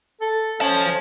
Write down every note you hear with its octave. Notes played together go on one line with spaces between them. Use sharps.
A4
C#4 C5 A5